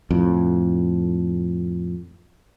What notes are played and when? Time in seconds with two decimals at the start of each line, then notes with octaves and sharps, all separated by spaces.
0.11 F2 A2